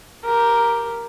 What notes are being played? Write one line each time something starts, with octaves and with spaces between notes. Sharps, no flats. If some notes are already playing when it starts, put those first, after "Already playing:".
G4 A#4